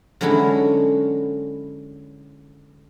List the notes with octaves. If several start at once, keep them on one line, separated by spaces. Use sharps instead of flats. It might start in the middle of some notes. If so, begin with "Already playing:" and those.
D3 F#3 G#3 C#4 E4 A4